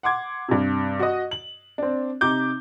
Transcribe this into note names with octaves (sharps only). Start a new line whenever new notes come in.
F#5 C6 D6 G#6
G2 C3
F#4 D#5
F#7
C4 D4
C3 D#4 D6 G6